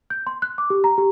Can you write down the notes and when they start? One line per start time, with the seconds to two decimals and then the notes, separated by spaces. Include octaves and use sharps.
0.10 G6
0.27 C6
0.42 F#6
0.58 D6
0.70 G4
0.84 A#5
0.98 G4